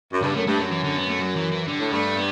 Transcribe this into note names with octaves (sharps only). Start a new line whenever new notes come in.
F#2
G2 C#3
B3
F#2 A3
G2 A3
F#2 F#3
E3
D3
B3
A3
F#3
E3
E3
G2 D3
A2
G2 A3
B3